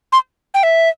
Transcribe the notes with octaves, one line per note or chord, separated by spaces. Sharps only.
C6
G5
E5